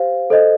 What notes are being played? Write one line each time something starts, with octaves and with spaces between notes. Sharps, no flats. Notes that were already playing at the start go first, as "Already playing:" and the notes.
Already playing: G4 C5 F5
A4 C5 D#5